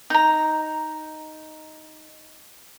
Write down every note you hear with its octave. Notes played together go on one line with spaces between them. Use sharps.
D#4 A#5